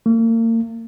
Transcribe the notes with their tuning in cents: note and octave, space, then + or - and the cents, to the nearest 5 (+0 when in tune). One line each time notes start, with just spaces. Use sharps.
A#3 -40